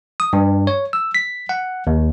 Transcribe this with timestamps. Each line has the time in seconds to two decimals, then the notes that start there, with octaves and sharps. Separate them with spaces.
0.20 D#6
0.33 G2
0.67 C#5
0.93 E6
1.15 B6
1.49 F#5
1.87 D#2